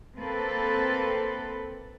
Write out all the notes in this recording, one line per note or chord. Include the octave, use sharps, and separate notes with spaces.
A#3 C4 A4 B4